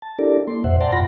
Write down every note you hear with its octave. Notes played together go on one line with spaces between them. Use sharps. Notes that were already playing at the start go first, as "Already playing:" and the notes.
A5
D4 E4 G4 A4 A#4 D5
A#3 C6
F2 A#2 C5 E5 F#5
D5 F#5 G5 A5 A#5 C6
F#2 A#2 F4 F#5 B5 A#6